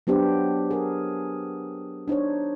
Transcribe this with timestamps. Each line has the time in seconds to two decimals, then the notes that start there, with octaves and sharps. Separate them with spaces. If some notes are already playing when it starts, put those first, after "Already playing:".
0.07 F#3 B3 D4 G4 C5
0.71 G#4 A#4
2.08 D4 D#4 C5 C#5